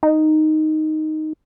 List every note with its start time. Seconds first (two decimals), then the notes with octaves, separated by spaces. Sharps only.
0.03 D#4